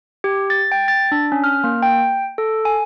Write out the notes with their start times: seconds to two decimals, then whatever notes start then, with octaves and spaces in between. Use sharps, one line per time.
0.24 G4
0.50 A6
0.72 G5
0.88 A6
1.12 D4
1.32 C#4
1.44 F6
1.64 A#3
1.83 G5
2.38 A4
2.65 G#5